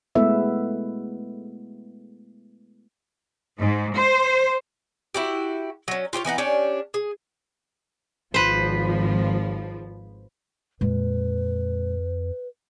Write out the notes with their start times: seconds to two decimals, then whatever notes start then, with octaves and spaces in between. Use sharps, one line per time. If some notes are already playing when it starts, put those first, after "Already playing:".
0.15 G#3 A3 B3 E4 B4 E5
3.59 G#2
3.96 C5
5.14 E4 F#4 G4
5.88 F#3 C#4
6.13 F4 G4 C5 C#5
6.25 E3 B3 D#4 F#5
6.38 C#4 D4 G4 C#5
6.94 G#4
8.34 G#1 F3 B4 C5
10.81 F2 A#2 G#3 B4